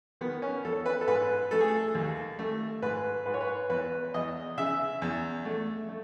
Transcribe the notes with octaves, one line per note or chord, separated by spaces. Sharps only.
D#3 B3
C#4
E2 A4
B4
A4
G#2 B4
A3 A4
G#4
A4
D#2
A3
G#2 B4
G#2 B4
C#5
B4
E2 B4
E2 D#5
C#3 E5
E2
A3
A3